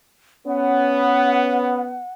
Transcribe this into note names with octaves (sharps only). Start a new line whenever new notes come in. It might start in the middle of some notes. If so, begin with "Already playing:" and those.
B3 C#4 F#5